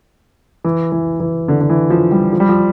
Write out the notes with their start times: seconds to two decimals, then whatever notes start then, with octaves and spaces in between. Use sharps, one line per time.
0.64 E3
0.92 E3
1.20 E3
1.48 D3
1.61 D3
1.70 E3
1.90 F3
2.11 G3
2.33 F3
2.40 G3
2.49 F3